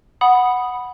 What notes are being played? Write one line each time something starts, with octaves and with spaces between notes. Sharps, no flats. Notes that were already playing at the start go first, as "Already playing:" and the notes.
F#5 B5 D#6